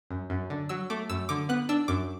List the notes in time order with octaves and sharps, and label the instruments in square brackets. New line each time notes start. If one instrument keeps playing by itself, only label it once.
[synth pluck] F#2
F#2
D3
F#3 E6
A3 D6
F#2 E6
D3 D6
B3 F#6
D4 E6
F#2 D6